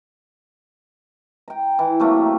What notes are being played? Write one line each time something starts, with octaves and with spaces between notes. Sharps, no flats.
G5 A#5
E3
C3 F#3 A3 A#3